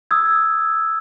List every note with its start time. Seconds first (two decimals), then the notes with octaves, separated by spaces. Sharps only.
0.11 D#6 E6 G#6